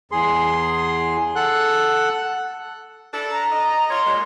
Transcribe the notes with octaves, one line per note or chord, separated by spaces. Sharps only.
E2 G#4 C6
A4 F#5 F#6
D4 E4 A4
A#5
D#5
F4 A#4 C#5 C6
A#2 G#3